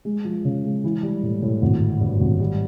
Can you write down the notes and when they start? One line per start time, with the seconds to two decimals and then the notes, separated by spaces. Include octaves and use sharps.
0.05 G#3
0.25 F3
0.45 C#3
0.65 G#3
0.84 E3
1.03 G3
1.23 A2
1.42 A2
1.62 G#1
1.81 D3
2.01 G2
2.21 G#1
2.40 G3